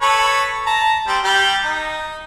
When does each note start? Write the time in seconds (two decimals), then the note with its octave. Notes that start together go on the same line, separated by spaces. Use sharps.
0.02 A4 B4 C#5
0.66 A5 A#5
1.08 G3 C4
1.24 G3 G4
1.64 D#4